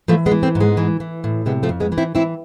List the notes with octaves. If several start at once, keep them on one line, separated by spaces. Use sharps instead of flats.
E3 F3 A3
G#3 B3
E3
A3 C4
G#2
G#3 B3
E3
E3
A2
C3 G#3 B3
F3 A3
F2
G#3 B3
E3
C4 E4
E3 C4 E4